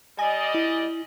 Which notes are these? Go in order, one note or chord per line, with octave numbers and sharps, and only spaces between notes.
G3 D5 D#5 G#5
E4